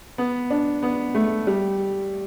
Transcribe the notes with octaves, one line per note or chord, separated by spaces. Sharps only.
B3
D4
B3
A3
G3